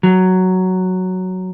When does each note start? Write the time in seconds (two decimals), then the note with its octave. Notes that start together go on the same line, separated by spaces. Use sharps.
0.03 F#3